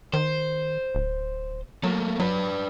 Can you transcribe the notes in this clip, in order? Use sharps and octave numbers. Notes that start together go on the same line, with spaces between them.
D#3 C5
D1
F#3 A3 A#3
F#3 D4 B4